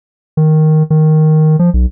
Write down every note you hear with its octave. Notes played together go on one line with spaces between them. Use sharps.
D#3
D#3
F3
B1